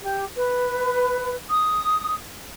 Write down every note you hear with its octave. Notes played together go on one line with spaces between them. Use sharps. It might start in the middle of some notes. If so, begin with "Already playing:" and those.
G4
B4
D#6